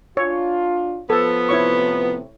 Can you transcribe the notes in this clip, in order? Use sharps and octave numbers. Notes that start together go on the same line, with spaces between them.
D4 F4 C#5
F3 B3 A4
A2 C3 E4 C#5 C#6